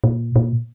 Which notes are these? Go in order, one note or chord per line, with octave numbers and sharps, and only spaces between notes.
A#2
A#2